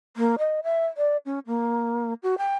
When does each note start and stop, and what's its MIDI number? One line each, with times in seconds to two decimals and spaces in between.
0.17 0.36 58
0.39 0.60 75
0.64 0.86 76
0.97 1.17 74
1.26 1.39 61
1.47 2.14 58
2.23 2.38 66
2.38 2.57 79